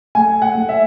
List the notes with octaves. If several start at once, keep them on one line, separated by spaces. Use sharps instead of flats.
A3 G#5
F#5
A3
E5